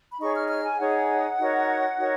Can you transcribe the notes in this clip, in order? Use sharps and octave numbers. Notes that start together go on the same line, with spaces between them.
B5
D#4 G#4 C#5 C#6
F6
F6
G#5
D#4 G#4 C#5 F#5
D#4 F#4 A#4 C#5
D#4 F#4 A#4 C#5